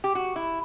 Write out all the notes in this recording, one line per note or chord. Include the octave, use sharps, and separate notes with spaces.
G4
F#4
E4